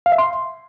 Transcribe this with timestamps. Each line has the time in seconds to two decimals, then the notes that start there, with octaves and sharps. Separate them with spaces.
0.06 F5
0.12 E5
0.18 C6